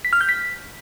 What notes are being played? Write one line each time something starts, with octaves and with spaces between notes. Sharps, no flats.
B6
F6
G6
B6